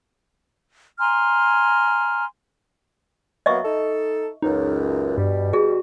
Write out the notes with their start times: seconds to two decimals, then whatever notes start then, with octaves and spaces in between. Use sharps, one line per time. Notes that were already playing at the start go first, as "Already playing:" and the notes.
0.99 G#5 A#5 C6 F6
3.46 F#3 A#3 B3 D#5 E5 C#6
3.64 D#4 A4
4.42 C#2 F#2 D#4
5.18 G2 B2 G3
5.53 F#4 G#4